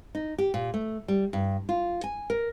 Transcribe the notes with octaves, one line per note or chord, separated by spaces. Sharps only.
D#4
G4
A#2
A3
G3
G2
F4
G#5
A#4